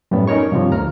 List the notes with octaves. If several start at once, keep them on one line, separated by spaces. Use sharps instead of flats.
F#2 A2 G3 B3
C#4 D#4 A#4 C#5 C#6
G2 C3 F3
D2 A#5 F6